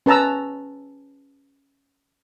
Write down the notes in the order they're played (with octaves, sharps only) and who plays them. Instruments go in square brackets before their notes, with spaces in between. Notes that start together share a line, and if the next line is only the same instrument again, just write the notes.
[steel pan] C#4 B4 A5 A#5 E6